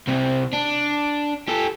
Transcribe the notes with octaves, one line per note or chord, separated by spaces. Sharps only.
C2 C4
D4
G4 A4